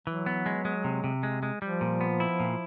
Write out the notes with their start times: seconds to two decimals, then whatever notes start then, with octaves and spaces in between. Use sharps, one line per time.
0.07 E3 F#3
0.26 B3
0.46 G#3
0.65 G#3
0.84 C3
1.04 C3
1.23 G#3
1.43 G#3
1.62 F3 G3
1.81 A#2
2.01 B3
2.20 E4
2.40 A#2